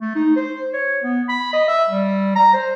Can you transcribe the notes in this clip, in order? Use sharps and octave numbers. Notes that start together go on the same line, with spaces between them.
A3
D#4
C5
C#5
B3
B5
D#5
E5
G3
A#5
C5